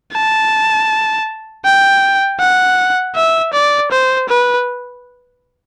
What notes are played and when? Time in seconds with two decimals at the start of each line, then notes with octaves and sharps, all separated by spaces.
0.13 A5
1.65 G5
2.40 F#5
3.16 E5
3.54 D5
3.91 C5
4.29 B4